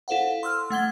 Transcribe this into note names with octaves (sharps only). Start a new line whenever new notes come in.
E4 A4 C5 F5 F#5
C6 E6 F6
A3 F#5 G#6 G7